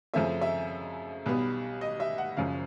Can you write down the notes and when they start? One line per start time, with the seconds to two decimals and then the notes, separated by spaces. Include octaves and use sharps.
0.14 F#2 C#3 F3 A3 C4 E5
0.41 E5
1.26 B1 B2 G3 B3
1.81 D#5
2.00 E5
2.18 F#5
2.37 F#1 F#2 C#3 F3 F5